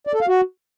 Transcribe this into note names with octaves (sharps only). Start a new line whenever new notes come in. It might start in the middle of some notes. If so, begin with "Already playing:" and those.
D5
A4
F5
F#4